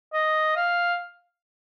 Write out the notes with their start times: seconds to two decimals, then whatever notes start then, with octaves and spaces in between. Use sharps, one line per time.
0.13 D#5
0.56 F5